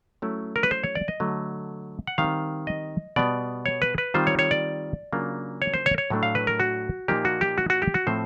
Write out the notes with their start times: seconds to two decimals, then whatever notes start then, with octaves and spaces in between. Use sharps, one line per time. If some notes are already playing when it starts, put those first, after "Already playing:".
0.22 F#3 A3 C#4 E4
0.56 A#4
0.63 B4
0.71 C5
0.84 C#5
0.95 D5
1.08 D#5
1.20 D3 F#3 A3
2.07 F#5
2.18 D#3 G3 C4 F5
2.67 D#5
3.16 B2 G3 B3 D5
3.66 C#5
3.82 B4
3.98 B4
4.14 D#3 G3 C4 F4 C5
4.27 C#5
4.39 C#5
4.51 D5
5.13 C#3 F#3 A#3 D4 F4
5.62 C#5
5.74 C5
5.86 C#5
5.98 C#5
6.10 A2 F#3 A3 D4
6.23 F5
6.35 B4
6.47 A#4
6.60 F#4
7.08 A#2 F3 A#3 D#4 G4
7.25 F#4
7.41 G4
7.58 F#4
7.70 F#4
7.82 G4
7.94 F#4
8.07 A2 F3 A3 C4 C5